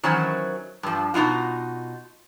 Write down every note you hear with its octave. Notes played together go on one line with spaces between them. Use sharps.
D#3 E3 F#3 C#4 C5
G2 F3
B2 D#4 F4 F#4